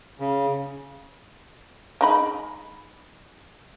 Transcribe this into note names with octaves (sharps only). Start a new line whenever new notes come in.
C#3
G#3 D#4 B5